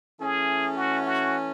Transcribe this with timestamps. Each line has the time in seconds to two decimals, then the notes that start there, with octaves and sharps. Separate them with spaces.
0.20 E3 A3 C#4 G#4
0.77 F#4
1.06 F#4